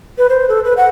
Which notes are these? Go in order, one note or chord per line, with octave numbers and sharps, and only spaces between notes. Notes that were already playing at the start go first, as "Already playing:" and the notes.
B4
C5
A4
B4
F#5